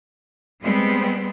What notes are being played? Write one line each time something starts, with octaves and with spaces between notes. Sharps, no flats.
G3 G#3 B3 C4